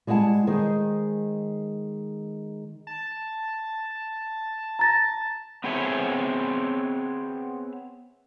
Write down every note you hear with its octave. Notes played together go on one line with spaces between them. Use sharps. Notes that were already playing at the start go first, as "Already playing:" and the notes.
G3 G#3 E4 F#5 A5
D#3 G#3 G#4 C5
A5
A#5 A6 A#6
B3 C4 G#4 C#5 E5